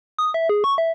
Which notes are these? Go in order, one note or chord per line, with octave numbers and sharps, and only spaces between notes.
D#6
E5
G#4
C#6
E5